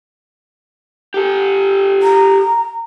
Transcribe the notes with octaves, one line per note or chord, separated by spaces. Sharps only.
G4 A4
A#5